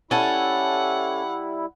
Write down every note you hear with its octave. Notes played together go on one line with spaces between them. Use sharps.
G3 C#4 E4 A4 F#5